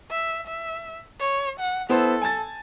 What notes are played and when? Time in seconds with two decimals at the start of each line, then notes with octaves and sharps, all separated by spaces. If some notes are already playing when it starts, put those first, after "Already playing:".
0.11 E5
0.47 E5
1.20 C#5
1.60 F#5
1.89 B3 E4 A4 C5
2.22 G#5 A5 A6